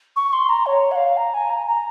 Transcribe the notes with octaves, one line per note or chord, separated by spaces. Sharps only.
C#6
C6
A#5
C#5
F#5
F5
A#5
G#5
A#5
A#5